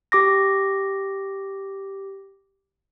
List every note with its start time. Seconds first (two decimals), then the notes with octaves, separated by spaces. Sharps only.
0.12 G4 D6 A#6